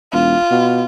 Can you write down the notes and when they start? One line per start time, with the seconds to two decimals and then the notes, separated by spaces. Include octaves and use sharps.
0.13 E1 F4
0.51 B2